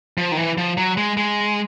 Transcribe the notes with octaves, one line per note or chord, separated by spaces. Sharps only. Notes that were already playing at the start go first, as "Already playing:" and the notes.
F3
D#3
E3
F3
F#3
G#3
G#3